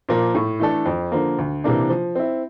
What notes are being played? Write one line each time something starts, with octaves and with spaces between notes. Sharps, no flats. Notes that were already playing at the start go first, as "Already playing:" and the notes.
A#2 F3 A#3
A2
E3 A3 D4 A4
F2
D3 F3 A#3
D2
C3 E3 A#3 D4
F3
C4 E4